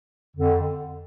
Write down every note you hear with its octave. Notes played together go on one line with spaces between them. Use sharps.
F2 D3